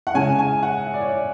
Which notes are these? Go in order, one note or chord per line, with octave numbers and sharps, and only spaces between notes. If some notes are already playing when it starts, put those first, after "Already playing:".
F#5
C#3 G#3 C#4 E4 G#5
G#5
F#5
E5
D5
C#5
D5